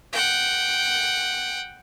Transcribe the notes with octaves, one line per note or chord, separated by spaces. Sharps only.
F#5 G5